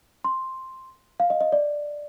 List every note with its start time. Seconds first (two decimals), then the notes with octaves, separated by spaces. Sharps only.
0.24 C6
1.20 F5
1.30 D#5
1.41 D#5
1.52 D5